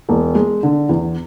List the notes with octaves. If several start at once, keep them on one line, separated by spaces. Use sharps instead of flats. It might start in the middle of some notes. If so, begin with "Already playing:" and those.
E1
G#3
D3
E2